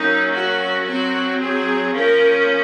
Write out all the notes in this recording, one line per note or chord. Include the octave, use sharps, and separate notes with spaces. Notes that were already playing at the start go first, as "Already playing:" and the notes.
Already playing: F#3 A#3 C#4 D#4
F#4
F#3 C4 F#4
G#4
F3 A#3 C#4 A#4